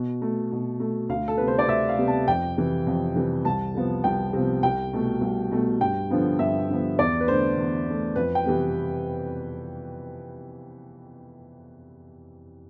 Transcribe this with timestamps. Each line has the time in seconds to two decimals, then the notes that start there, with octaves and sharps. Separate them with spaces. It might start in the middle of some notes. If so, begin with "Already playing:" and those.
Already playing: B2
0.22 A3
0.52 B2
0.80 A3
1.09 D2 F5
1.28 A4
1.38 C3 G3 B3 B4
1.48 C5
1.59 D5
1.68 D2 E5
1.89 F5
1.98 C3 G3 B3
2.08 A5
2.28 F2 G5
2.57 C3 E3 G3
2.87 F2
3.16 C3 E3 G3
3.45 C2 A5
3.74 C3 F3 B3
4.04 C2 G5
4.33 C3 F3 B3
4.63 C2 G5
4.93 B2 A3
5.21 C2
5.51 B2 A3
5.80 G2 G5
6.10 D3 F3 B3
6.39 G2 E5
6.69 D3 F3 B3
6.98 E2 D5
7.21 B4
7.27 D3 A3 C5
7.58 E2
7.86 D3 A3
8.16 F2 B4
8.35 G5
8.45 C3 E3 G3 B3